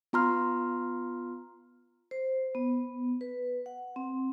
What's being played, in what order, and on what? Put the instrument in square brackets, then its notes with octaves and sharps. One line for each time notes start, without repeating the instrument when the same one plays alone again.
[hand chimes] B3 F4 A#5 C6 F6
[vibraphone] C5
B3
B4
F#5
C4